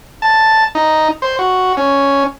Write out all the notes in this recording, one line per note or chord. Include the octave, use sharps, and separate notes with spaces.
A5
D#4
C5
F#4
C#4